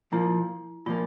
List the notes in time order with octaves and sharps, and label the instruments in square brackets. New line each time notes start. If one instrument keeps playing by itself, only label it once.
[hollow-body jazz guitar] A#2 F3 A#3 [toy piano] E4
[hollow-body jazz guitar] A#2 F3 A#3 [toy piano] F4